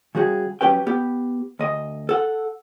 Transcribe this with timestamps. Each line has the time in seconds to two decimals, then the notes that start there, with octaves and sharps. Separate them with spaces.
0.15 C#3 G3 F#4 G#4
0.61 F#3 C#4 G4 B4 G5
0.87 B3 G4
1.59 D2 D#5
2.09 A4 F#5